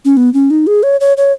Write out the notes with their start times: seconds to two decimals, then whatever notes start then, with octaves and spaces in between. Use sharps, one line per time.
0.05 C#4
0.17 B3
0.34 C#4
0.50 D#4
0.67 G#4
0.83 C#5
1.01 C#5
1.17 C#5